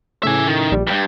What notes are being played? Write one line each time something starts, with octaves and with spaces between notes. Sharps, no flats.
A2 C#3 A3 E5 G#5
D#3
A#1 G3
E2 G2 G5 B5